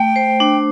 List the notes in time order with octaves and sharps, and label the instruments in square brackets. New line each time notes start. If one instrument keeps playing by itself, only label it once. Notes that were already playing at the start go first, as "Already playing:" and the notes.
Already playing: [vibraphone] A3 [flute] G5
[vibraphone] C5
D4